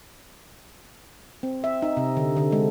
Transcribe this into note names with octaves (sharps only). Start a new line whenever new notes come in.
C4
E5
D#4
C3
D3
D3
G#3